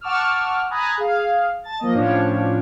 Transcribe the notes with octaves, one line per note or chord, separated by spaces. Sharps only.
F#5 A5 C#6 D6 E6 F6
G#5 A#5 B5 D#6 F#6 A6
G#4 F5
A5 A6
F3 A#3 D#5
A2 F3 C#4 D4 C#5